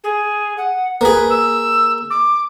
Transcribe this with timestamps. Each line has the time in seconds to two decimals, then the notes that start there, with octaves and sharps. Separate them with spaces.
0.04 G#4
0.57 F#5
1.01 A#3 G#4 B4
1.29 E6
2.10 D6